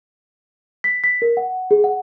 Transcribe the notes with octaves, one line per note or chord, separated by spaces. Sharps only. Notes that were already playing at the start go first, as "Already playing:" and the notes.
B6
B6
A#4
F#5
G#4
F#5